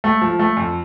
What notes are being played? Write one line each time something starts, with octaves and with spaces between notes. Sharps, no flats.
A3
F3
A3
F2